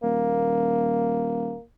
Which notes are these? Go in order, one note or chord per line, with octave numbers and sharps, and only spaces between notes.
D#1 A#3